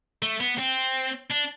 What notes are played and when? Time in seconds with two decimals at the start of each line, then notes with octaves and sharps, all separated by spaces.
0.22 A3
0.40 B3
0.58 C4
1.30 D4